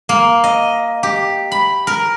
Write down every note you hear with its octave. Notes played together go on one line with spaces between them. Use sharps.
A#3
D#5
G4
B5
A#4